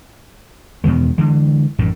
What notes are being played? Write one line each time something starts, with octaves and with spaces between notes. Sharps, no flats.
E2 B2 D#3 G#3
D3 E3 G#3
A1 F#2 A2 D#3